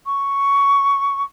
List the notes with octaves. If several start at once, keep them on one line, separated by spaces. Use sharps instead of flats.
C#6